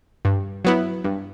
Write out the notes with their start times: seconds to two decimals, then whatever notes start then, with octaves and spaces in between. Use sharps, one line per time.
0.25 G2
0.65 F#3 B3 E4
1.04 G2